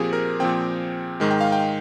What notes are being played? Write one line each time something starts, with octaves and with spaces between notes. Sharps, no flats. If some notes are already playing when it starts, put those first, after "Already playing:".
Already playing: A#2 F3 C4 G4 G#4
A#4
A#2 F3 C4 G5
G#2 D#3 G#3
G5
F5
G5